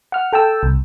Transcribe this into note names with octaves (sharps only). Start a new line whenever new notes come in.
F#5 F6
A4 G5 A5 E6
C2